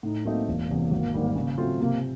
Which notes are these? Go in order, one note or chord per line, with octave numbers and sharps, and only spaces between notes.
A2 D#4
F#3 A3 A#3 C4 D#4
E1 A#3
E2 C3
G#1
G#2 D#3 G3
C#3
F#3 A3 C4 F4
C3 A#3